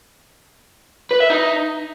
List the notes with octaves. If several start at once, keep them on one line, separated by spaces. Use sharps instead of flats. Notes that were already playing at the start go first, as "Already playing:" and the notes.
B4
E5
D#4